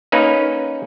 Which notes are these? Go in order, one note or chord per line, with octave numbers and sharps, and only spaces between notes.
A#3 C#4 D#4 B4